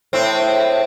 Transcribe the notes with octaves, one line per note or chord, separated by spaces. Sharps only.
A2 C4